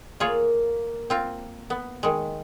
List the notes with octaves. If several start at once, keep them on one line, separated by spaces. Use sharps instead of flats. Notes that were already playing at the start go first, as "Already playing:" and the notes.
A#3 F4 G#4 C#5
C4 F4
B3
D#3 G#3